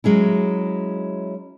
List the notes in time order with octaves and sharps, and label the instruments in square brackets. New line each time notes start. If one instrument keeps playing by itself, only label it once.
[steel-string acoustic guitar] F#3 G#3 C#4 E4